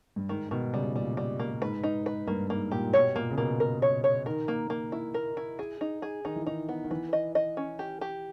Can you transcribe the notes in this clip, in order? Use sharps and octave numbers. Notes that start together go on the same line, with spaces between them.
G2
G#2 D#3
B2 D#3
C#3 G3
A#2 G3
G3
A#3
G#2 B4
D#4
B4
G2 A#3
G#2 A#3
A#2 G4
B2 C#5
A#2 A#3
C#3
B2 A#3
A#4
C#5
C#5
D#3 A#4
A#3
A#3
E4
A#4
E4
G#4
D#4
G#4
D#3 D#4
E3
D#3 D#4
B3
D#3
E3 B4
D#5
D#5
C#4
G4
G4